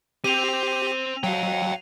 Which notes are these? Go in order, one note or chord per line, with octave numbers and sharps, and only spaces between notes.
C4 G4 D#7 F7
F#3 F5 G5